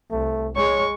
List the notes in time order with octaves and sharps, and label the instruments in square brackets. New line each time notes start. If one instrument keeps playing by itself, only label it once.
[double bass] C2 [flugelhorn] A3
[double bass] G#3 [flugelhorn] C#5 [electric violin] C#6